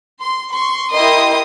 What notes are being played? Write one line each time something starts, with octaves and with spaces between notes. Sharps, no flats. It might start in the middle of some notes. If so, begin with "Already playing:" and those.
C6
C6 C#6
E4 G4 A#4 D#5 C6 D#6